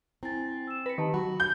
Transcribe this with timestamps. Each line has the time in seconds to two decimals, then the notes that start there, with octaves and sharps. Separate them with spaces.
0.23 C4 E4 G#5 A6
0.67 E6 E7
0.86 B4 A#6 C#7
0.98 D#3 G4 A5 B5
1.14 F#3 F#4 B5
1.40 G6